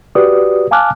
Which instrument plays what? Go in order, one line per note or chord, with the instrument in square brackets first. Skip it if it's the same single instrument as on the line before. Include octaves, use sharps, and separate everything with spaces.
[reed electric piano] F#4 G4 B4 D5 D#6
F5 G#5 A5 D6 F6 F#6